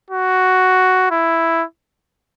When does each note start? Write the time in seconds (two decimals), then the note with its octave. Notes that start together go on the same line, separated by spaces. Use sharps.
0.10 F#4
1.11 E4